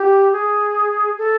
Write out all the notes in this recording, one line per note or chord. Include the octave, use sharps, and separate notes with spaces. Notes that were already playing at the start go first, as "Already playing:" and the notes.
Already playing: G4
G#4
A4